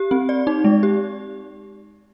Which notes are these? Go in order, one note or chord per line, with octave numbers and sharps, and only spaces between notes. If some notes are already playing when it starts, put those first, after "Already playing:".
Already playing: G4
C4
D5
D#4
G#3
G4